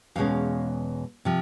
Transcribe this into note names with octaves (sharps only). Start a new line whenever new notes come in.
E2 B2 G#3 C#4 F5
C3 F3